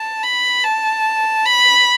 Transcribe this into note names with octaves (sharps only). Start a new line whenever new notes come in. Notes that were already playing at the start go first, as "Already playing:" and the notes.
Already playing: A5
B5
A5
B5